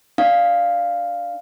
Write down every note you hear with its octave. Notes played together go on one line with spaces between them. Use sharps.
D4 F5